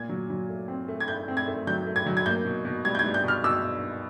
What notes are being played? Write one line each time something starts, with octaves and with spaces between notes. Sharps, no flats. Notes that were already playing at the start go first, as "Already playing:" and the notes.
Already playing: A#2 G#6
F#3
F#3
A3
C4
A3
G#6
A3 G6
C4
G#6
A3
F#3 G6
A3
G#6
F#3
G#6
A#3 G6
B2
B2
G3 G#6
G6
G#6
G3
G6
B2 F6
B2 E6